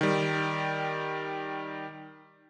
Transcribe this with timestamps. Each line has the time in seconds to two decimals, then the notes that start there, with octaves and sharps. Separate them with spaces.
0.01 D#3 G3